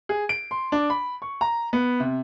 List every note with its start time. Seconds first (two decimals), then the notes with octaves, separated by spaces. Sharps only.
0.09 G#4
0.29 D7
0.51 C6
0.72 D4
0.90 B5
1.22 C#6
1.41 A#5
1.73 B3
2.00 C3